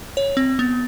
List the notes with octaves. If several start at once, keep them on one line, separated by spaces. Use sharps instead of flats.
C#5
C4
B3